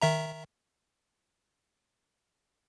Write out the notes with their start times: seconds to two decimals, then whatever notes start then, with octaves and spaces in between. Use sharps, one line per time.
0.02 D#3 E5 A#5